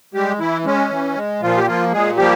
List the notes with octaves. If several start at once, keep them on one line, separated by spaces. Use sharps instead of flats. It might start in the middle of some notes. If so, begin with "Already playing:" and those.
G3 G#3 G4
E3 E4
G#3 C#4
E3
G#3
A#2 F3 F4
G4
F3 A#3 F4
A#2 G#3 G#4
F3 G3 A#3 G4